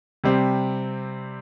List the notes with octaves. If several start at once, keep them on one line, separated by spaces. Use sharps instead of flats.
C3 G3 C4